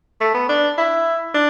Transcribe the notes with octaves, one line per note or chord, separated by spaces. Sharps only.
A3
B3
D4
E4
D4